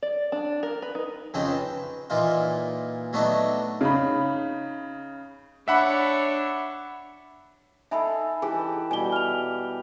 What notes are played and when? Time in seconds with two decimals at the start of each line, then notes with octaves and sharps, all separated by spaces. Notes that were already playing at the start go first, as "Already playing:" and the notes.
0.02 D5
0.32 D4
0.63 A#4
0.82 B4
0.95 D#4
1.34 F2 C#3 C4 D#4 G5
1.51 B4
2.10 A#2 E3 D#4 F4
3.13 F#3 A3 B3 D4 D#4 B4
3.81 C#3 D#4 B5
5.68 D4 C#5 E5 F#5 B5
7.91 D#4 G#4 A4 E5 G#5 B5
8.42 E3 G4 G#4
8.91 B2 G3 G4 G#5 G7
9.12 F6 F7